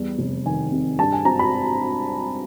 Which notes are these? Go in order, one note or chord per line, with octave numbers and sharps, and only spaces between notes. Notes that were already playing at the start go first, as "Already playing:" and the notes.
Already playing: E2 G3
F1
D#3 G#5
C3
G2 A5
G#5
G#1 A#5
B5